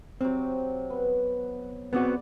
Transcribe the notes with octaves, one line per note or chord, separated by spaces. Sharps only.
C3 F#3 C4
B3
B3 C4 F#4 G#4 D5